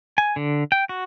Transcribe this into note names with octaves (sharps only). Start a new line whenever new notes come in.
G#5
D3
G5
F#4